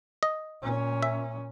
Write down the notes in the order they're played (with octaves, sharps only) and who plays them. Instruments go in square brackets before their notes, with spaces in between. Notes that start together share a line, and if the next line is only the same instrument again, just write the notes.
[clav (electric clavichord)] D#5
[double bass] A#2 C#4
[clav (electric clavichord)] E5